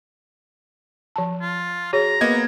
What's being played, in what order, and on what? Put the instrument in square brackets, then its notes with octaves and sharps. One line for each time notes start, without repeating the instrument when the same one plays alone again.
[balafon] F3 A5
[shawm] F4
[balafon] F#4 G#4 C#5 [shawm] A#5
[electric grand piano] A#3 B3 G#6 [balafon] D#5